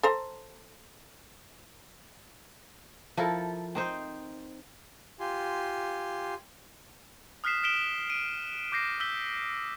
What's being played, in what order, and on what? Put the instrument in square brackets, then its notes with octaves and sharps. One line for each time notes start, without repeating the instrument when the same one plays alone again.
[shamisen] A4 C5 A#5
[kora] F3 E4 A4 A#4
C4 D#4 C5
[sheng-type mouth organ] F4 G4 G#5 C6
[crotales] D#6 F6 F#6 B6 C7 E7
F6 B6 D7 E7 G7
D7 D#7
D6 G6 A#6 C7
E6 G6 B6 G7